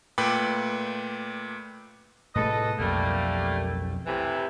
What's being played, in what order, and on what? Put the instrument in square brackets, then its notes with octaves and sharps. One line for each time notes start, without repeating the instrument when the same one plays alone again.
[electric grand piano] A#2 A3 B4 G5 B5 D6
[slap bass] A2 C3 G#3 [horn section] A4 B4 D#5
[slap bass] B1 F2 [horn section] G3 A3 A#3
[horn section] A2 C3 E3